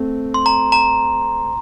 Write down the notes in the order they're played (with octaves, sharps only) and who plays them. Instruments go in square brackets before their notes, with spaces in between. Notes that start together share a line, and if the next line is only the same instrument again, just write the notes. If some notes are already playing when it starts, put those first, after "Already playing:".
Already playing: [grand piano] A3 C4
[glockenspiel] C6
A#5
A#5